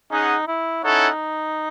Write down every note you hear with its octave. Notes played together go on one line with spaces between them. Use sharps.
C#4 D#4 G#4 D#5 F#5
E4
C#4 D#4 E4 A4 C#5 F#5